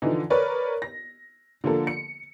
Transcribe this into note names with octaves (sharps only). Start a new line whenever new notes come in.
D3 E3 F3 D#4
A#4 B4 C#5 D5
A#6
D3 F3 A#3 A4
C#7